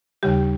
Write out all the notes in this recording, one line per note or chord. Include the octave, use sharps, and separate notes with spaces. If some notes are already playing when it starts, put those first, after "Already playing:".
D#2 C#3 G3 G4